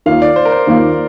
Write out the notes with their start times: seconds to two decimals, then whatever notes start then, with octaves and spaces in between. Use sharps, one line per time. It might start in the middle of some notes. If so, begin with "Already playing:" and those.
0.06 D#2 D#3 A#3 F4 F5
0.22 D5
0.36 C5
0.45 A#4
0.52 C5
0.67 D#2 D#3 A#3 F4